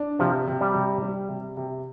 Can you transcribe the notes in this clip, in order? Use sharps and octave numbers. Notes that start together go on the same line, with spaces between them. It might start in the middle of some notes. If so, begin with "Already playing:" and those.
Already playing: D4
C3 F3
C3
G3
C3
G3
C3
C3